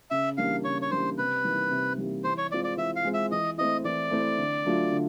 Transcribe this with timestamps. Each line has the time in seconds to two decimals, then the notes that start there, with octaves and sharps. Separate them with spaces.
0.11 C#3 E5
0.38 E3 G3 A#3 D4 F5
0.64 C#3 C#5
0.82 C#5
0.90 E3 G3 A#3 D4 C5
1.18 C3 B4
1.44 E3 G3 A#3 D#4
1.71 C3
1.98 E3 G3 A#3 D#4
2.24 E3 C5
2.38 C#5
2.51 G#3 C4 F4 D5
2.64 D5
2.77 E3 E5
2.96 F5
3.05 G#3 C4 F4
3.14 E5
3.31 E3 D#5
3.58 A3 C4 E4 D#5
3.84 E3 D5
4.11 A3 C4 E4
4.38 D3
4.65 F#3 A3 D4 F4
4.92 D3